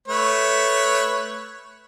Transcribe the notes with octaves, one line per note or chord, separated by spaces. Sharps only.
A3 B4 C#5